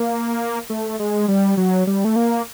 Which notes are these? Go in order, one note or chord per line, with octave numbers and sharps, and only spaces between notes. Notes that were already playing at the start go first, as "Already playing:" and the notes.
Already playing: A#3
A3
G#3
G3
F#3
G3
A3
A#3